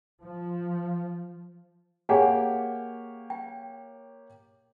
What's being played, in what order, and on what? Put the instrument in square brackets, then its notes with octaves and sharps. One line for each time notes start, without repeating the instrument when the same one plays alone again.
[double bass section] F3
[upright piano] A#3 G4 C#5 [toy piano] G#4 F#5 G#5
[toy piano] G5